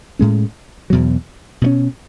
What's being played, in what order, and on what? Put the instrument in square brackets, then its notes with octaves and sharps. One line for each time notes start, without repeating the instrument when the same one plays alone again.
[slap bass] A2 G#3 C#4
E2 B2 F#3
B2 A3 C#4